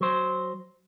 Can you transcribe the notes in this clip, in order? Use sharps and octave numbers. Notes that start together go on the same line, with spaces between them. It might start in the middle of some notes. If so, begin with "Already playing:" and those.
F#3 C5